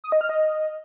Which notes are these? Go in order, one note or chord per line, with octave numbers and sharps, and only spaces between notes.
D#6
D#5
F6
D#5